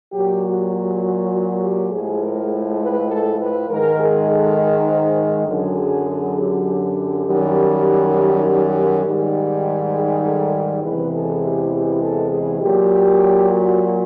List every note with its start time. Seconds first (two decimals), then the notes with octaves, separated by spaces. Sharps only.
0.12 A#2 F#3 G4
0.42 F#4
0.72 G4
1.01 F#4
1.32 F#4
1.61 G4
1.90 A2 F3 G#3 G#4
2.20 A#4
2.80 B4
3.10 A4
3.39 B4
3.69 G#2 D#3 G#3 A#4
3.99 G#4
4.28 A4
4.58 A#4
4.88 C5
5.47 F#2 D3 F#3 G#4
6.36 G4
7.26 F#2 D#3 G3
9.04 G#2 D#3 G3
9.93 G#4
10.22 A4
10.81 E2 C3 E3 G#3 B4
11.11 A4
11.41 G4
11.71 G4
12.01 A4
12.30 G#4
12.60 A#2 F#3 G4
13.49 F#4